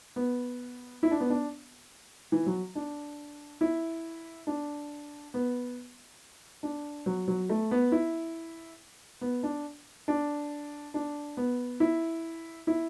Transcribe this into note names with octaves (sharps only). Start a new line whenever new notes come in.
B3
E4
D4
B3
D4
E3
F#3
D4
E4
D4
B3
D4
F#3
F#3
A3
B3
E4
B3
D4
D4
D4
B3
E4
E4